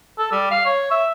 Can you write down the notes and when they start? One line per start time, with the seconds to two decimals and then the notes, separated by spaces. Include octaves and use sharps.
0.19 A4
0.32 G3
0.51 F5
0.65 C#5
0.91 E5